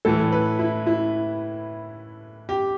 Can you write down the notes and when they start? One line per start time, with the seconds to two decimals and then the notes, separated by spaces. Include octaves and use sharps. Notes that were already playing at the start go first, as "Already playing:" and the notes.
0.05 A2 E3 A4
0.32 B4
0.59 E4
0.86 E4
2.49 G4